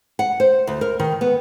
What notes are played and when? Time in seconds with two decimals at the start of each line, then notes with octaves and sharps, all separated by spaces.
0.19 F#5
0.40 C5
0.67 D2
0.81 A#4
0.99 D#3
1.21 B3